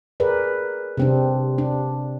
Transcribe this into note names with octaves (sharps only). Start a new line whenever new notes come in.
G#4 A#4 B4 D5
C3 C4 D4
D4